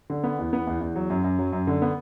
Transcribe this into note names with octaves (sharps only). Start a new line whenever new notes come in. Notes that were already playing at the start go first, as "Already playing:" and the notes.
D3
B3
E2
B3
E2
E2
F#3
F#2
F#2
F#3
F#2
D3
B3